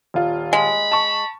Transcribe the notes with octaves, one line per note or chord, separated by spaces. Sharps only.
D#1 F4
G#3 B5
A5 C#6